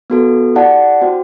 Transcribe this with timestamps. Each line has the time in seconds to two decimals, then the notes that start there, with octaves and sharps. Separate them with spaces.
0.10 B3 F#4 A4
0.55 E4 G4 D5 F#5 A5
1.02 C4 F#4 C5 G5